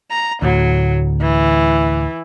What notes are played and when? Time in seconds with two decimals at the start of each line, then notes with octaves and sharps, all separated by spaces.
0.11 A#5
0.42 D2 A2 F#3
1.21 E3